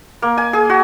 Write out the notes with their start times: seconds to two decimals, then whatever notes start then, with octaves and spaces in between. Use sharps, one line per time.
0.22 A#3
0.37 G#5
0.53 G#4
0.70 F#4